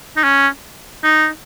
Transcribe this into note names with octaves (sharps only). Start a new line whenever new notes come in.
D#4
C#4
D#4